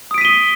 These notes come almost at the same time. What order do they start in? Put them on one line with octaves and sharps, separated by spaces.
D#6 D7 B6 D#7 G7